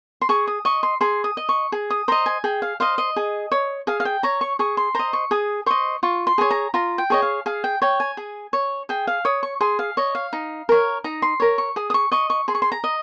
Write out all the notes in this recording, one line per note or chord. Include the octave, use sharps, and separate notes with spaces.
C6
G#4 C#6
D#6
D#5 C#6
C6
G#4 C6
D#6
D#5
C#6
G#4
D#6
C5 D#5 A#5
G#5
G#4 G5
F5
C5 D#5 F5
D#5
G#4
C#5
G#4 F5
F5
G5
C#5 A#5
C#6
G#4 C#6
C6
C5 D#5 A#5
C#6
G#4 D#6
C5 D#5 C#6
F4 C#6
C6
G#4 C#5 G#5
A#5
F4 A#5
G5
G#4 C#5 D#5
F5
G#4 F5
G5
C#5 G5
G#5
G#4
C#5
G#4 G5
F5
C#5 D#6
C#6
G#4 C6
F5
C#5 D#5
F5
D#4
A#4 C#5
D#4 A#5
C6
A#4 C#5
C#6
G#4 D#6
D#6
C#6
D#5 C#6
C#6
G#4 C6
C#6
C6
A#5
D#5